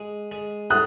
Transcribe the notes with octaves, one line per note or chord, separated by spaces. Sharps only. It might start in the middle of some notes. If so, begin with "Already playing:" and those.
Already playing: G#3
G#3
A2 D#6 F#6